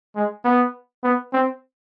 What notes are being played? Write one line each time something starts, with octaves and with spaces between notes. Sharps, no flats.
G#3
B3
B3
C4